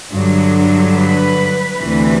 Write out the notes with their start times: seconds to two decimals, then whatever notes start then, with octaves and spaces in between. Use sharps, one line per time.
0.12 G2 D3 F#3
0.95 B4
1.79 D2 C3 E3